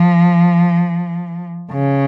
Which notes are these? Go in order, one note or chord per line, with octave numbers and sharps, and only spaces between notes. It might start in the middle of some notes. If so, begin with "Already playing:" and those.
Already playing: F3
C#3